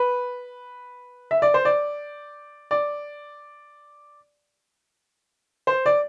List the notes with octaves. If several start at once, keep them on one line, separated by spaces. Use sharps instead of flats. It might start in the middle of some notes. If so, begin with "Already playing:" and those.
Already playing: B4
E5
D5
C5
D5
D5
C5
D5